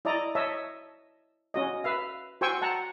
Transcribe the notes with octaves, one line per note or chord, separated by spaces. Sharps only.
E4 D5 D#5 A#5
C#5 D#5 E5 A5
C#4 F#4 D#5
B4 E5 F5
F#4 C5 G5 G#5 C#6 E6
F#5 A5 A#5